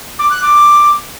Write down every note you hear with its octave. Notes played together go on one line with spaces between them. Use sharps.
D6
F#6
D6